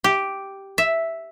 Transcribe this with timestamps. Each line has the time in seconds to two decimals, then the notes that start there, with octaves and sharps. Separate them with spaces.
0.04 G4
0.78 E5